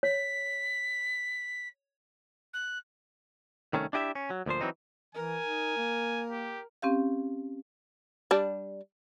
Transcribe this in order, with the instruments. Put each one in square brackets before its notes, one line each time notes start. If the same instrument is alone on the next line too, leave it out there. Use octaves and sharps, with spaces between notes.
[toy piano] C#5 [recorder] B6
[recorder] F#6
[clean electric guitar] C2 D#3 A3 C#4
D4 E4 G4 D#5 E5
C#4
F#3
D2 A#2 F3 C5
E3 F#3 C4 D#4
[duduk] E3 [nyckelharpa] A#4 [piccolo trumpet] G#5
[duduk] D#4
A#3
[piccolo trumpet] G4
[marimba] C4 C#4 G4 F5
[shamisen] G3 D4